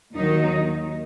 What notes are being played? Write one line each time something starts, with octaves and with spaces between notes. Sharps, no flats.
D#2 D#3 F#3 D#4